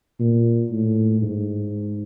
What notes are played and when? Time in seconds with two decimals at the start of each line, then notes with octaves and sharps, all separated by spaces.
0.20 A#2
0.72 A2
1.22 G#2